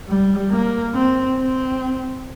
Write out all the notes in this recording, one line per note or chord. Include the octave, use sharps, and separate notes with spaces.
G3
A#3
C4
C4